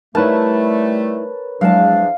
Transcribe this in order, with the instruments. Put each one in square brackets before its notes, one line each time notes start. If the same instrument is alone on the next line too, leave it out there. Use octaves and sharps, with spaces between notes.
[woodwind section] G3 A3 [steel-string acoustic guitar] D#4 E4 [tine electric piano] A#4 B4 C#5 [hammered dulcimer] A5
[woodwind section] E2 F3 D4 [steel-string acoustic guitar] F#3 G#3 A5 [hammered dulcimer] F5